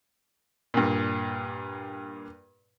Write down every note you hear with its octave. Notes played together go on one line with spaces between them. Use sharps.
G2 A#2